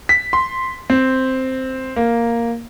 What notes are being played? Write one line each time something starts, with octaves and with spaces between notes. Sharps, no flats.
B6
C6
C4
A#3